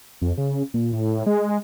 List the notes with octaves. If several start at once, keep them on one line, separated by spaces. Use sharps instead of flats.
F2
C#3
A#2
A2
G#3